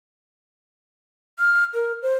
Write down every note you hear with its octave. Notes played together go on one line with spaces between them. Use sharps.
F6
A#4
C5